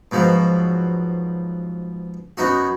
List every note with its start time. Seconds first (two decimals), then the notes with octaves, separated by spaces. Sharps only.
0.11 G#2 B2 F3 F#3
2.37 F#2 B3 D#4 F#4